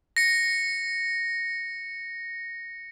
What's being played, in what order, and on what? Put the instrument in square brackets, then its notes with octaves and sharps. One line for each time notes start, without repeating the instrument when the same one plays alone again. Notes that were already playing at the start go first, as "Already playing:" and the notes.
[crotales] A#6 C#7